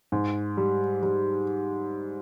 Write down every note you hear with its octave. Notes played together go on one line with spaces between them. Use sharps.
G#2
G3
G3